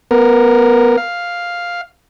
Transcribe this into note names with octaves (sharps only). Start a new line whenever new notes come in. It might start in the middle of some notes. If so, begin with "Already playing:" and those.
B3 A#4
F5